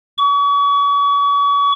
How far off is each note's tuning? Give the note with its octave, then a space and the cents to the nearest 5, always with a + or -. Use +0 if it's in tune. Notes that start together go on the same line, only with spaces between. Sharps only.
C#6 +40